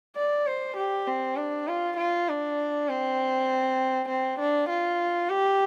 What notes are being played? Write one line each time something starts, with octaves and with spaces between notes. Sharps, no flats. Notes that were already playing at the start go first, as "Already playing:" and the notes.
D5
C5
G4
C4
D4
F4
F4
D4
C4
C4
D4
F4
G4